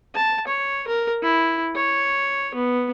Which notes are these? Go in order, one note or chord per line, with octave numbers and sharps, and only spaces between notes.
A5
C#5
A#4
E4
C#5
B3